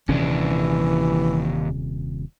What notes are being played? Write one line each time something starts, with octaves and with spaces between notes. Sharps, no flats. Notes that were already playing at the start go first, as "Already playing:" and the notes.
D#1 D#2 C3 E3 C#4 D4